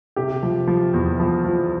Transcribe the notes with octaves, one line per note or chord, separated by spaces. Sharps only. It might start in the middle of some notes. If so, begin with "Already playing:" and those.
C3 G4
F3
F3
E2
F3
F3